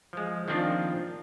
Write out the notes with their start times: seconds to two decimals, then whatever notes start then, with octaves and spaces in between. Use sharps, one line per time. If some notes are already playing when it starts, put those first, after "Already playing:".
0.13 F3 G#3
0.48 D#3 F3 A#3 C4 D4 F4